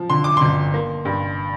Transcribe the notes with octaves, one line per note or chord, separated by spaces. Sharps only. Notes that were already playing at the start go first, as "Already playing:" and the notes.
Already playing: F3
D3 C6
D6
G1 C6
A#3
G2